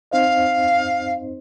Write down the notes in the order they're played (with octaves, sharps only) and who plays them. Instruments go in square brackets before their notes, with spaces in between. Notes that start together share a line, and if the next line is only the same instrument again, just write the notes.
[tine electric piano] C4 D#4 C5 D#5 [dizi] F5